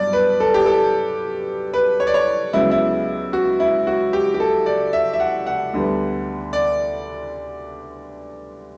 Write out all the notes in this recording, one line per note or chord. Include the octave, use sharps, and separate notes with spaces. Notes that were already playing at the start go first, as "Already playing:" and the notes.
Already playing: G2 F#3 B3 D5
B4
A4
G4
A4
B4
C#5
D5
C#5
C#2 C#3 F#3 B3 E4
E4
F#4
E4
F#4
G4
G4
A4
D5
E5
E5
F#5
F#5
D2 D3 G3 B3
D5